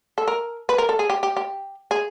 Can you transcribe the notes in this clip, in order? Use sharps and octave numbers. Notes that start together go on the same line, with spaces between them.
A4
A#4
B4
A#4
A4
G#4
G4
G4
G4
G#4